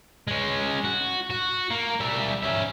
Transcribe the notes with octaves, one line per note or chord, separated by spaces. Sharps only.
G#3 C#4
F#4
F#4
A#3
G3 E5
C#4 E5